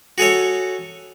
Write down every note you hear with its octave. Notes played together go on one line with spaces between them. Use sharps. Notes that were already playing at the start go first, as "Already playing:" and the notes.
F#4 G#4 A4 C#5